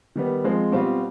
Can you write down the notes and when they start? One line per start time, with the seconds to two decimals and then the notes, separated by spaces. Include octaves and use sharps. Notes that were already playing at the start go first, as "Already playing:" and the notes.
0.16 D#3 G3 B3
0.44 F3 G#3 C4
0.72 B2 G3 C4 F4